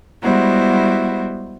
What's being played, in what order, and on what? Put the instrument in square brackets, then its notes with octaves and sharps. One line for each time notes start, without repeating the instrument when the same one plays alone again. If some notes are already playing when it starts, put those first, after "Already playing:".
[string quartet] G3 G#3 B3 E4 F#4 C5